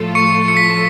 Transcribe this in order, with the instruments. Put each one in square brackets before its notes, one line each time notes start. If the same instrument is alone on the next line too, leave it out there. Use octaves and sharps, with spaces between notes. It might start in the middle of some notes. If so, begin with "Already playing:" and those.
Already playing: [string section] A2 F3 A3 F4 A4
[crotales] C#6 C#7
C#7
B6